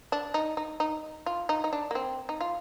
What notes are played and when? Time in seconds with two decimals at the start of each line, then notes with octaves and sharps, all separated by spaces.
0.12 D4
0.34 D#4
0.57 D#4
0.80 D#4
1.26 F4
1.49 D#4
1.64 D#4
1.73 D4
1.91 A#3
1.95 C4
2.29 D#4
2.41 F4